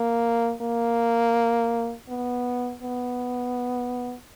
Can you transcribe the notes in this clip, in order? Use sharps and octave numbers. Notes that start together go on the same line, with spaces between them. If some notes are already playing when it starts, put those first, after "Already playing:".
Already playing: A#3
A#3
B3
B3